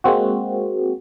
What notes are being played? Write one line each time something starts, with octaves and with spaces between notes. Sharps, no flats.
G#3 A#3 C4 F#4